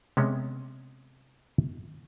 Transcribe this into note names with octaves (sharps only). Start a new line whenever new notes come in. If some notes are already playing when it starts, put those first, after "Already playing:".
C3 G#3 B3 C#4